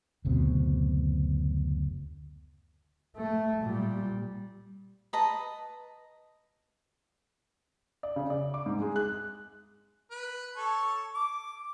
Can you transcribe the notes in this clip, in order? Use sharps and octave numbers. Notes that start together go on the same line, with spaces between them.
F#1 D2 B2 C4
A3
A#2 G3
B4 D#5 A5 A#5
D5
C#3
D5
D6
G#2
G#3
F#6
B4
A4 C#5
D6